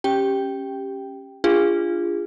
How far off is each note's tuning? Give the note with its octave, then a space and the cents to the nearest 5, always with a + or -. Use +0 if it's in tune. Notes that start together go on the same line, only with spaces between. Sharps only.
C#4 -15 G4 +0 G5 +0
D4 +0 F4 -15 G#4 -25